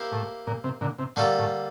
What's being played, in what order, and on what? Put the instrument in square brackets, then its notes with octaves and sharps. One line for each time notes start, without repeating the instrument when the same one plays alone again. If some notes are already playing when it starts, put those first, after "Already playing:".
Already playing: [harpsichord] A#3 E4 G4 C5 F5
[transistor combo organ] A2
A#2
C3
A#2 D3
C3
[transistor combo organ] A2 [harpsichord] D3 G3 A#3 F4 A4
[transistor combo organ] A2